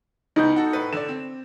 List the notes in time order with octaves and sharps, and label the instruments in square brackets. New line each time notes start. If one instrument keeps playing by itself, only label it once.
[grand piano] C#2 B3 G6 [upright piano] D#4
[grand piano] F#4 A4
A2 B4
[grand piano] D3 D5 [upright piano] E7
[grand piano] C4